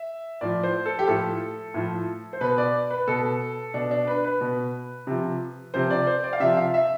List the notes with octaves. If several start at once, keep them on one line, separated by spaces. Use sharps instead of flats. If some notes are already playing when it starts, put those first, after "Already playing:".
Already playing: E5
A2 F3 D5
C5
A4
G4
A2 F3 A4
A2 F3
C5
B2 B4
D5
B4
B2 A4
B2 D4
D4
B4
B4
B2
C3 F3
C3 F3 C5
D5
C5
D5
F5
C3 F3 E5
F5
E5